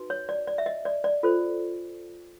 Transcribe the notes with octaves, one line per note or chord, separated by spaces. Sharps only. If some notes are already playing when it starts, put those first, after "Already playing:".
Already playing: D#4 F#4 B4
C#5
D5
D5
E5
D#5
D5
D5
F4 A4 C5